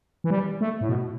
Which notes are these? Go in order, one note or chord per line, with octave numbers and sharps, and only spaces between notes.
E3
G3
A3
A2
B2